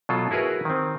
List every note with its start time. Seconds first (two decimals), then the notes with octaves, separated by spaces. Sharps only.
0.09 B2 F#3 F4 A4
0.31 E4 F#4 G#4 A#4 B4
0.65 D#3 C4